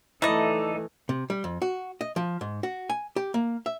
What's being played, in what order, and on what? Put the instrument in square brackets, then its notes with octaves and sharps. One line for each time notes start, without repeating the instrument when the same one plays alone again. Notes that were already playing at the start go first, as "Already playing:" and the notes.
[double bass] E3 A3 [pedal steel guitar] D#4 A4 D5 [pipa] E4 D#5
[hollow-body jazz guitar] C3
G3
F2
F#4
D#5
F3
G#2
F#4
G#5
G4
A#3
E5